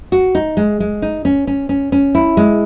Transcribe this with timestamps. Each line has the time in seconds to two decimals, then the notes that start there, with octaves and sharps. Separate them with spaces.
0.12 F#4
0.35 D#4
0.57 G#3
0.80 G#3
1.02 D#4
1.25 C#4
1.47 C#4
1.69 C#4
1.92 C#4
2.15 E4
2.37 G#3